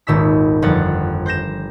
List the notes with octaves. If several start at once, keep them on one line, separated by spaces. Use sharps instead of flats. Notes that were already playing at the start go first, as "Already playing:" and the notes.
D#1 G#1 D#3 E6 B6
G1 F2 F#5 A6
C5 G6 A#6 E7